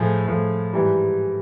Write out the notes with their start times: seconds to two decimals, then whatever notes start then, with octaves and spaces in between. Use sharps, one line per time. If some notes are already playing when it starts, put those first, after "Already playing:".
Already playing: A2 F3 G#4
0.27 A2 F3
0.73 G#2 E3 G3